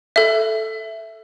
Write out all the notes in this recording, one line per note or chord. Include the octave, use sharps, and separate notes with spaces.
A4 E5